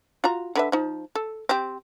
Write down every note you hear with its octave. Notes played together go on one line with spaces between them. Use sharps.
F4 F#4 A#5
D3 B4 E5
F3 D#4
A4
C4 G4